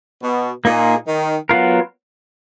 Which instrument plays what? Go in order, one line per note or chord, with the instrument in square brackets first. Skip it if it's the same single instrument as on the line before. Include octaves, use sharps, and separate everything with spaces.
[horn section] B2
[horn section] A#2 [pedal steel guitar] A#3 D#4 G#4
[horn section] D#3
[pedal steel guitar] F#3 B3 F4 A#4